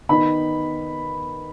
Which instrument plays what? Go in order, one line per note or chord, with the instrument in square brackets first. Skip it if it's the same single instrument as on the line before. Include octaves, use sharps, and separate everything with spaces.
[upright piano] D#3 B3 D#4 B5